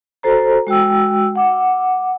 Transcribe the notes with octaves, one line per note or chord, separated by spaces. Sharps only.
F#4 A4 C5 A#5
G#3 F#4 G5 E6
F#5 D6